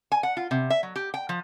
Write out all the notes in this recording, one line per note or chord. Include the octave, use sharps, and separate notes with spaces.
G#5
F#5
F4
C3
E5
F#3
G4
G5
F3